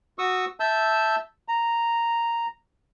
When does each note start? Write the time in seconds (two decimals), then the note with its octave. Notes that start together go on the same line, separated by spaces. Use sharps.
0.18 F#4 C#6 D#6 E6
0.60 E5 A5 E6 G6
1.48 A#5